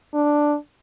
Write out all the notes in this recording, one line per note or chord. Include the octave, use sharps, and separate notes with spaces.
D4